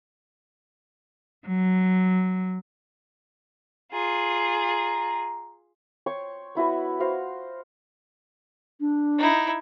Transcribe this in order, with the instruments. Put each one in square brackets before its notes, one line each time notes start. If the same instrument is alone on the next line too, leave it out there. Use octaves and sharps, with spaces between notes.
[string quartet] F#3
[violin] F4 G#4 [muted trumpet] A#5
[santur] C#5 G5 C6 C#6
B3 E4 F#4 B4
F#4 C5 F5 C6
[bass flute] D4
[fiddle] D#4 E4